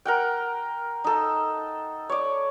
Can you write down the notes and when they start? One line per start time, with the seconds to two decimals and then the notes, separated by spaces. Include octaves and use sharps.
0.05 A#4 F#5 G5
1.04 D#4 A4
2.09 C#5 D5